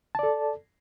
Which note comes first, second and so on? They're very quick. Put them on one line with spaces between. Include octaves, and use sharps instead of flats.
A5 D5 A4